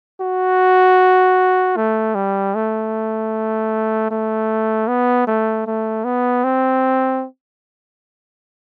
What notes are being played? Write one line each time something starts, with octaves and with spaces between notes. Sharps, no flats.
F#4
A3
G3
A3
A3
B3
A3
A3
B3
C4